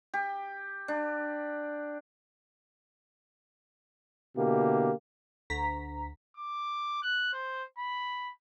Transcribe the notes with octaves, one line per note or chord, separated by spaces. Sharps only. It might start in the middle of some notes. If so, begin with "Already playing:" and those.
G4
D4
B2 D3 A#3 E4 G4
D2 A#5 B6
D6
F#6
C5
B5